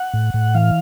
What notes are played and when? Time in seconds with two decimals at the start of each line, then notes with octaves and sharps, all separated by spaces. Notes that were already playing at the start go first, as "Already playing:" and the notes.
Already playing: F#5
0.14 A2
0.34 A2
0.55 E3 F5